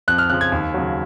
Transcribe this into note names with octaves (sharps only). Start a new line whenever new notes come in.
F2 F#6
F6
C#3 F3 F#6
G#6
D#2
C#3 F#3